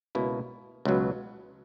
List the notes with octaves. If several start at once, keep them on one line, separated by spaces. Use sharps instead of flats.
C#2 B2 A#3 E4
C#2 B2 F#3